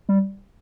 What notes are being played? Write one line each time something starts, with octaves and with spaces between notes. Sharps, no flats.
G3